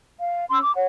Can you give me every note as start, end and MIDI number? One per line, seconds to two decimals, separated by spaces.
0.18 0.44 77
0.50 0.59 61
0.50 0.59 84
0.50 0.59 88
0.61 0.74 86
0.75 0.87 73
0.75 0.87 78